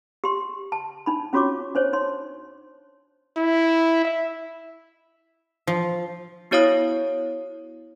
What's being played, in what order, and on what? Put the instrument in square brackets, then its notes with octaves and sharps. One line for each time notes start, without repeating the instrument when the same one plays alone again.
[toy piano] G4 C6
A5
D4 D#4 B5
C#4 F4 F#4 C#5 C#6 D6
D4 C5 C#5
D#4 C#5 C6
[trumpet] E4
E5
[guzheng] F3
[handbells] B3 E4 F#4 C#5 F5 D#6